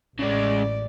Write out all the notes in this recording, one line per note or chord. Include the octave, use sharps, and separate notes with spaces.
A1 C#3 G#3 D5